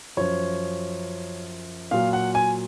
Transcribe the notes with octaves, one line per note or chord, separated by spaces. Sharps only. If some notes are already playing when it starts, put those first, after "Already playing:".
F#2 F3 C#5
A#2 F#3 F5
F#5
G#5